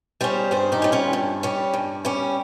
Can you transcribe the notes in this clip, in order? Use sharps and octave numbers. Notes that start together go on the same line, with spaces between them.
G3 C#4 G#4 C5
G2 G#4 C5
D#4 G4
G3 C#4
C#4 F4
G2
G3 C#4
G2
G3 C#4